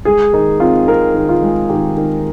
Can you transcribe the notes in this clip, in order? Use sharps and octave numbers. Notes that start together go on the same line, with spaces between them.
G#3 G#4
D#3 D#4
C4 F4
C4 A#4
D#3
F4
G#3
D#3 G4
D#3